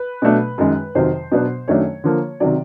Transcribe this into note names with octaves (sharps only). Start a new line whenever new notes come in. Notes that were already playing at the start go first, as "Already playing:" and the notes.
Already playing: B4
B2 F#3 A3 D4
F#2 D#3 G#3
F2 C3 D#3 F#3 C5
B2 F#3 B3 D4
F#2 D#3 F#3 A3 D4 C#5
D3 F3 A#3
C3 D#3 F#3 D5